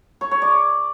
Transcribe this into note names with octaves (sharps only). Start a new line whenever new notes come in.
C#5
C#5
D5